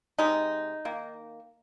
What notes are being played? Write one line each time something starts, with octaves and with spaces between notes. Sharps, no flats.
C3 G#3 D#4
D#3 A#3